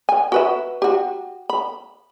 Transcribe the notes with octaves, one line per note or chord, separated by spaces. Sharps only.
G#5
F#4 B4 E5
F#4 G4
B5